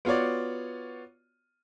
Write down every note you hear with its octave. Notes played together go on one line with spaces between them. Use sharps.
B3 F4 F#4 C#5 D5